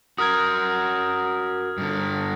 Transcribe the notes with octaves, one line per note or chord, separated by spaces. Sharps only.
F#4 A#4 D#6 F6 G#6
G2 D3